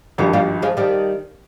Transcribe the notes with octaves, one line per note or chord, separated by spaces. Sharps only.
G#1 G2 F3 G3 A#3
G3 A#3
F3 G#3
D#3 G3